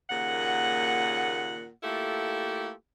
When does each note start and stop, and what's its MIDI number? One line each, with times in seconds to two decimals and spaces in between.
0.10 1.69 39
0.10 1.69 46
0.10 1.69 49
0.10 1.69 78
1.83 2.72 57
1.83 2.72 58
1.83 2.72 64
1.83 2.72 65
1.83 2.72 67
1.83 2.72 69